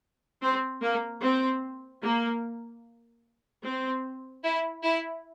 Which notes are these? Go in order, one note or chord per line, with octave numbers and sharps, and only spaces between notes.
C4
A#3
C4
A#3
C4
E4
E4